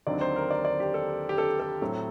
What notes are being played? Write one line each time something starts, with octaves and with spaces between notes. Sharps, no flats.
D#2 D3 F#3 C4 D#4 D5
C5
A#4
D5
D5
G4
A4
G4
A4
A4
A2 F#3 A3 C4